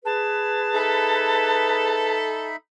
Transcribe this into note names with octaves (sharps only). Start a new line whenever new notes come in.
G#4 B4 A5
D#4 A4 E5 B5